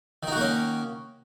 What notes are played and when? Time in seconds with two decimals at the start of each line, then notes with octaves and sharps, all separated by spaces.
0.23 D#3
0.27 D#4
0.32 F#4
0.36 A#3
0.41 C#4